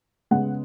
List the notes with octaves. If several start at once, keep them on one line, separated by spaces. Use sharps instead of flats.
C#3 G#3 B3 F#5